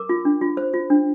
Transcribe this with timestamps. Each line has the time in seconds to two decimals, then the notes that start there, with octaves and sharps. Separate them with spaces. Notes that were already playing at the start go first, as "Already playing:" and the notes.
Already playing: A#4 D6
0.09 F4
0.25 D4
0.41 F4
0.57 C5
0.74 F4
0.90 D4